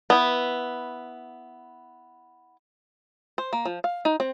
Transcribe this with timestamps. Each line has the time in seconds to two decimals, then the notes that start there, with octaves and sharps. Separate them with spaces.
0.10 B3 E4
3.38 C5
3.53 A#3
3.65 F3
3.84 F5
4.05 D#4
4.20 C4